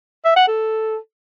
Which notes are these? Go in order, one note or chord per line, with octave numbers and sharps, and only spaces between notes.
E5
F#5
A4